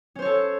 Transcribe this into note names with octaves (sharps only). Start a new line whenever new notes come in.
C#4 A4 C5 C#5